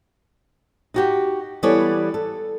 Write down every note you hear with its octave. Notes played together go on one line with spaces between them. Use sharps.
D#4 F#4 G4
E3 G3 B3 A4 C#5 D5
A4